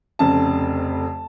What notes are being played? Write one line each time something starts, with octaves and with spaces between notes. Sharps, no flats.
F1 F2 C#3 A5